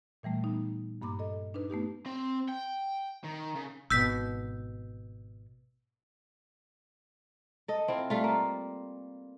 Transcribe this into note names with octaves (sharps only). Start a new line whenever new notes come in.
A#2 E3 G3 A3
B3 D#4
G2 A#3 B5 D6
A4 D#5
D4 D#4 B4
A3 B3 D#4 G4
C4
G5
D#3
C#3
G#1 B2 E6 G6 B6
A4 D#5
C4 E4 F4
G3 A3 F4
A#3